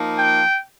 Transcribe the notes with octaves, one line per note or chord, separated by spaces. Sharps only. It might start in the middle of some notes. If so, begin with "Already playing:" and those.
Already playing: F3 A#3 D#4
G5